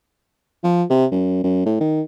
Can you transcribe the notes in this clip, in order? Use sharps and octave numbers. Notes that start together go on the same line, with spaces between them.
F3
C3
F#2
F#2
A2
D#3